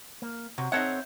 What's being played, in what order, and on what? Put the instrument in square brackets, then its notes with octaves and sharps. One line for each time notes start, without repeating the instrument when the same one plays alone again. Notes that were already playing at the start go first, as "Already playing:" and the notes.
[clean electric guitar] A#3
[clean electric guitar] C3 [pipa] F#3
[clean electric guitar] C4 C#5 E5 [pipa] D#4 A4 F#5